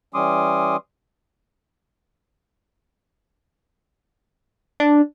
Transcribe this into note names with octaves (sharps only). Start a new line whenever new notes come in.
E3 G3 C#4 C6 D6 D#6
D4